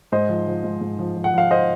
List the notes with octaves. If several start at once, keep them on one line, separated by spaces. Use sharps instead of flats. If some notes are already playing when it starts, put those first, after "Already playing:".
G#2 C5 D#5
F3
F3
G#2
G#2
F3
F3
F#5
F3 F5
C5 D#5